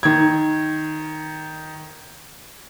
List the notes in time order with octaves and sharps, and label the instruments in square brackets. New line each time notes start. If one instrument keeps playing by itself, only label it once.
[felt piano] D#3 G#6